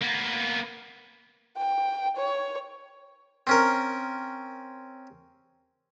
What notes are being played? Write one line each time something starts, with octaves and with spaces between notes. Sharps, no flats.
A#3 B3
G5
C#5
C4 C#4 A#4